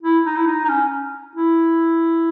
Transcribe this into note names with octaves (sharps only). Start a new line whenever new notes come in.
E4
D#4
E4
D#4
D#4
C#4
E4